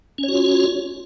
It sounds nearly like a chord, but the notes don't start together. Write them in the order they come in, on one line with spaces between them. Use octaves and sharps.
C#4 C#5 F#4 F4